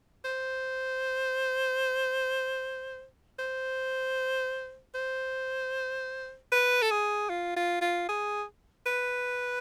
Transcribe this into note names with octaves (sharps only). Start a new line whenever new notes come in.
C5
C5
C5
B4
A4
G#4
F4
F4
F4
G#4
B4